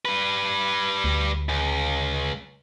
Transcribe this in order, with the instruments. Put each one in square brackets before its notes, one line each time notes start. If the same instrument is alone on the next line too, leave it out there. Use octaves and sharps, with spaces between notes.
[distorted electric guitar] G3 B4
[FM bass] D2
[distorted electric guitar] C#2